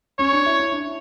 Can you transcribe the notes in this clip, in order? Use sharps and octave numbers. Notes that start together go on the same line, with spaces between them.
C#4 C#5
D4
E4
E4
D4